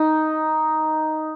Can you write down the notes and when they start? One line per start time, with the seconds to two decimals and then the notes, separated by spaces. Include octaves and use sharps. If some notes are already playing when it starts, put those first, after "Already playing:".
Already playing: D#4